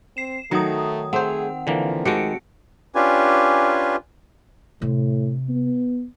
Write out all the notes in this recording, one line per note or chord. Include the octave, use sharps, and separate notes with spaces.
C4 C7 E7
D#3 F#3 A3 A#5 D#6
A3 C4 G#4 C5 F#5
D3 E3 F3 A#3
D#3 G#3 A3 F#4 G4 C#7 D7
C#4 D4 F4 G4 B4 G#5
A2 C3
B3